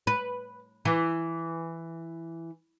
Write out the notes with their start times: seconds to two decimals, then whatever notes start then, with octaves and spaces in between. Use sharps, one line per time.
0.07 B4
0.85 E3